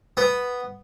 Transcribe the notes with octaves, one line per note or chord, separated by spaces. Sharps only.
B3